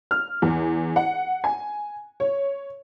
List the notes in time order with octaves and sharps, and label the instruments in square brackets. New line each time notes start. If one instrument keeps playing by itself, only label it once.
[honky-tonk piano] F6
E2
F#5
G#5
C#5